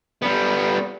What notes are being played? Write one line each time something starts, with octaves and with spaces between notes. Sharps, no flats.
G3 B3